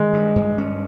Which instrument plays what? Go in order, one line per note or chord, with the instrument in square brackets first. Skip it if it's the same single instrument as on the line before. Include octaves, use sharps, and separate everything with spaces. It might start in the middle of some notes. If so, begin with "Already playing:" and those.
Already playing: [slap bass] D#3 [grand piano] G#3
[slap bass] G2
G2
C#4